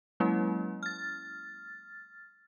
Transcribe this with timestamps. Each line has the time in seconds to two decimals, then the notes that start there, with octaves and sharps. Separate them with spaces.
0.20 F#3 G#3 A#3 C#4 E4
0.83 F6 A6